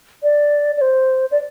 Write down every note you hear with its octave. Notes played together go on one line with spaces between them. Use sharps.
D5
D5
C5
D5